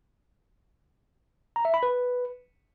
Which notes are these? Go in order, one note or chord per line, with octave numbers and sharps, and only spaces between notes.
A#5
E5
B5
B4